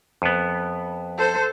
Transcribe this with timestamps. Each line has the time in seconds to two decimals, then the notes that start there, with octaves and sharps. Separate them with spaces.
0.22 F2 B3
1.18 A4 C5